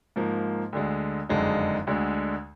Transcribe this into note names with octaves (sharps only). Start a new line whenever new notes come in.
G#2 F3 A#3
D2 D3 G#3
F#1 F2 D3 G#3 D#4
D2 D3 G#3